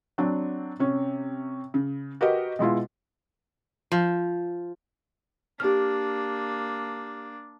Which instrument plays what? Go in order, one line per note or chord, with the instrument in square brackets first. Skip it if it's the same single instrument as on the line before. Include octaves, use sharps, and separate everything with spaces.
[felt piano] F#3 C4 D4
C3 C#4
C#3
F#4 G4 A#4 B4 D#5
B2 G#3 E4 F4
[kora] F3
[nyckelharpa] A#3 D4 [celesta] G4 F6